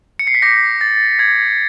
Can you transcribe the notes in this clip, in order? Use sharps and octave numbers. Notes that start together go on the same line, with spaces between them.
C#7
C7
B6
D6 G6 A#6
A6
D6 G6 G#6